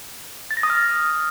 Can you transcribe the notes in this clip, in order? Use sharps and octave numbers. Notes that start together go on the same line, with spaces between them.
A6
A#6
D#6
F6